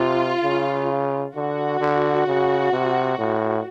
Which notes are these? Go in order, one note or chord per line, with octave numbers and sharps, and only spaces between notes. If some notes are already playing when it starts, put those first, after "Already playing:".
Already playing: C3 F4
C#3
D3 F#4
D3
C#3
C3
A2